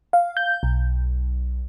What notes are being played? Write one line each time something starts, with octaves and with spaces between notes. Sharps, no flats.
F5
G6
B1